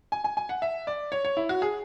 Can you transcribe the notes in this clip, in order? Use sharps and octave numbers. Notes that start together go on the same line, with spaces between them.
G#5
G#5
G#5
F#5
E5
D5
C#5
C#5
E4
F#4
G#4